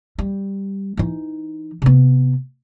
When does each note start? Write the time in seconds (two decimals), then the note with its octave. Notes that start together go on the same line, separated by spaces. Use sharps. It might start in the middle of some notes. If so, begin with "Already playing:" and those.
0.19 G3
0.97 E3 D#4
1.82 C3 B3